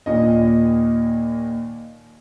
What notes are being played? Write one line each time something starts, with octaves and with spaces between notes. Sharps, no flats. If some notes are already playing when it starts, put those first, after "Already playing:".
D#2 A#2 D#5